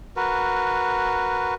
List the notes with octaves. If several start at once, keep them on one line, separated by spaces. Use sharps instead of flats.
F#4 A#4 B4